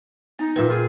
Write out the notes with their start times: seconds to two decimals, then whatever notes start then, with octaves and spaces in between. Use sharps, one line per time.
0.39 B3 D#4
0.56 A#2 B4 E5 G5
0.70 F4 G#4